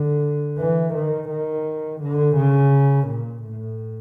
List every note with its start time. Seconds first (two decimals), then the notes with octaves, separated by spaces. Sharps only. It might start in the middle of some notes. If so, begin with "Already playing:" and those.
Already playing: D3
0.58 E3
0.94 D#3
1.29 D#3
2.01 D3
2.36 C#3
3.08 A#2
3.43 A2